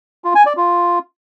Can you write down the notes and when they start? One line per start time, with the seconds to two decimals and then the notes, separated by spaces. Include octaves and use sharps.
0.24 F4
0.35 G#5
0.46 D5
0.57 F4